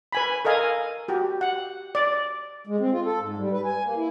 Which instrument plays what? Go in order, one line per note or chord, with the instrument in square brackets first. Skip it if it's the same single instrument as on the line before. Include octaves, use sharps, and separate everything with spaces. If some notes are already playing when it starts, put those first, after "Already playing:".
[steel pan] B4 G#5 B5
A4 A#4 D#5 F5 G#5
F#4 G4
F#5
D5
[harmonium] G#3
C4
F4
A4
G#2
G3
B4
G#5
A#3
E4